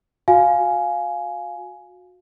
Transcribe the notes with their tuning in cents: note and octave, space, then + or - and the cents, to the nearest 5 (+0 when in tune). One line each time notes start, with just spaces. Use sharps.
F#4 -25 F5 +0 G#5 +10